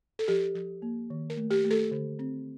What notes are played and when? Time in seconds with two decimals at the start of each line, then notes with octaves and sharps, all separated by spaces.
0.19 A4
0.28 F3 G4
0.55 F3
0.82 A#3
1.10 D#3
1.30 A#4
1.37 A3
1.51 G4
1.64 A3
1.71 A4
1.91 D3
2.19 C4